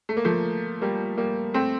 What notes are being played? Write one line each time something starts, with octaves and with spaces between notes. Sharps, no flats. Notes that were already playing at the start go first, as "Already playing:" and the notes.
A3
A#3
F3 A3
G3 A#3
G3 A#3
A3 C4